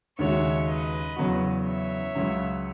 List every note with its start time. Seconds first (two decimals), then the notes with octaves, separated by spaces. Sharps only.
0.18 D#2 C#3 G#3 D#4 F#4 C#5 E5
0.67 B4 D#5
1.16 E2 C#3 F#3 B3 F#4
1.66 C#5 E5
2.15 C#2 C#3 F#3